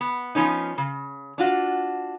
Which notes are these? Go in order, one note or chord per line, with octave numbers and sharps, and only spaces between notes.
B3
F3 B3 C#4 D#4
C#3
D4 F4 F#4